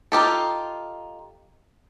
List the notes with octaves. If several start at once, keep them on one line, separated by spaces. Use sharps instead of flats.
D#4 F4 G4 A4